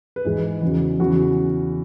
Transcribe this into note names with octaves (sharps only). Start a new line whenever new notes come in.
B4
G#2 E3 G#4
E2 C#3 F#3
E2 C#3 F#3 F#4